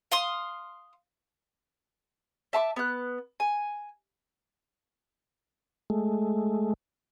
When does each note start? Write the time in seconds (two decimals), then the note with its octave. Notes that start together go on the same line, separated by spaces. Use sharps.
0.12 F5 C6 D#6
2.53 E5 A5 C6 D6
2.76 B3 F#6
3.40 G#5
5.90 G#3 A3